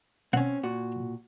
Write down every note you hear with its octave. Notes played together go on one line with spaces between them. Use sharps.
C4 C#4 F#5
A#2 F#4